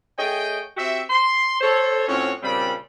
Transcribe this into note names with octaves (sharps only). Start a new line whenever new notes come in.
A3 G#4 C#5 D#5 G5
C4 F#4 G4 E5
C6
A4 C5 C#5
A2 C4 C#4 F4 F#4 C#5
A#2 C#3 G3 C4 D4 B5